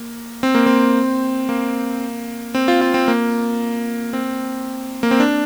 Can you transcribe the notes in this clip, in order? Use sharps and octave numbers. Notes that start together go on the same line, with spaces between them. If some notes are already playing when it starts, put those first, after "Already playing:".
Already playing: A#3
C4
A#3
C4
A#3
C4
F4
F4
C4
A#3
C4
A#3
C4
D4